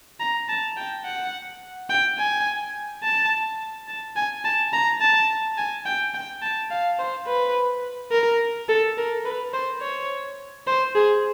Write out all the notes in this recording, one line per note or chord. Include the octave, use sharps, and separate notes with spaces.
A#5
A5
G5
F#5
G5
G#5
A5
A5
G#5
A5
A#5
A5
G#5
G5
G5
A5
F5
C5
B4
A#4
A4
A#4
B4
C5
C#5
C5
G#4